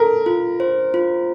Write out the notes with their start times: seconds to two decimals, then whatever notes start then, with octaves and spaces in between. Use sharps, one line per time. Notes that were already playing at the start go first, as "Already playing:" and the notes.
Already playing: A4 A#4
0.26 F4
0.60 C5
0.94 F4